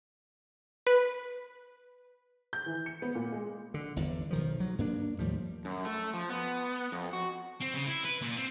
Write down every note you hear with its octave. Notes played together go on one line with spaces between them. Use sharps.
B4
G6
E3
C#7
B3
A#2
G#3
D3
G1 E2
B1 D#3 F3
F#3
G2 A#3 D4
D#2 A2 F3 G3
F#2
A3
F3
B3
F2
F#4
C4
C#3
E4
B4
A#2
C4